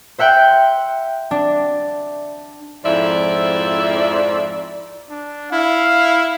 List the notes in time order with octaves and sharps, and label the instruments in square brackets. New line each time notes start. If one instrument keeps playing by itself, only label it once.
[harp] C5 E5 F#5 G5 G6
D4
[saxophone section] F2 G#2 F3 E4 D5 E5
[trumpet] D4
[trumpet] E4 [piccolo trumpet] F5